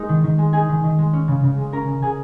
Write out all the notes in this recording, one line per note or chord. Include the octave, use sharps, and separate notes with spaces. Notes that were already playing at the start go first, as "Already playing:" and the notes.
Already playing: G#3 D#4 A#4
D#3
D#3
G#3
D#4 G#4 G#5
D#3
D#3
G#3
C#4
C#3
C#3
G#3
C#4 A#4 A#5
C#3
C#3 G#4 G#5